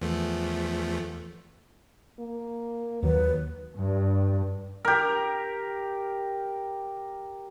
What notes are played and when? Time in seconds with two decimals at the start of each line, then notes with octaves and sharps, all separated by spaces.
0.01 E2 F3 A3
2.19 A#3
3.03 D#2 D#3 F#3 B4
3.75 G2
4.85 G4 A#4